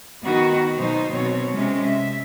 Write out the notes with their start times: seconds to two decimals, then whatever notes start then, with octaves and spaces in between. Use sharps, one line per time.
0.23 D#3 B3 D#4 F#4
0.76 B2 F#3 D#4 C5
1.12 B2 C4 C#5
1.52 C3 G#3 C#4
1.84 E5